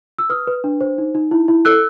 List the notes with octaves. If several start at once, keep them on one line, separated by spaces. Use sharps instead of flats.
E6
B4 D#6 F6
B4
D4
C5
D#4
D#4
E4
E4
A4 E6 F#6